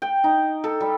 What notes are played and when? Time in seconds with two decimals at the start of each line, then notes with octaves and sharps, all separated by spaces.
0.02 G5
0.24 D#4
0.64 A4
0.81 G3